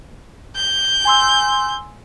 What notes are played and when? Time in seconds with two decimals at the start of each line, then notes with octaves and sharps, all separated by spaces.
0.57 G6
1.05 G#5 C6 E6